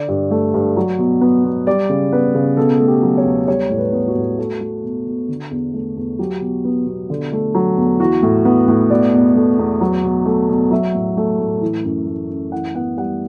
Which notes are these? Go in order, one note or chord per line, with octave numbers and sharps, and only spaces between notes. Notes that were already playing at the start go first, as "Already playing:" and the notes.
Already playing: D3 D5
G2
A3
G2
F#3
B2
B3
B2
G3 D5
C#3
B3 B4
C#3
B2 A4
A3
G4
F#3
C#5
E2
G3 C#5
A2
B4
B3
F#4
A2
A3
A3
B2
B2
D3
E2
A3
E2
F#3 G4
B2
B3
B2
D3
A3
F#3
E2
E3 F#4
A2
B3
A2
B2 D5
E2
A3
E2
F#3
B2
A3
B2
F#3 E5
A2
A3
A2
E3
F#2
A3
F#2
E3 F#5
B3 F#5
G3 F#5